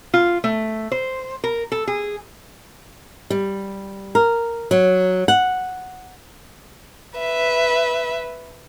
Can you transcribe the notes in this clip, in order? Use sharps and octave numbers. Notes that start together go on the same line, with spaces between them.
F4
A3
C5
A#4
A4
G#4
G3
A#4
F#3
F#5
B4 E5